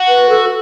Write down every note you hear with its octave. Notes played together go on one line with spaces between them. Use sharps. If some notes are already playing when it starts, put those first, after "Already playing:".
Already playing: F#4
B4
A4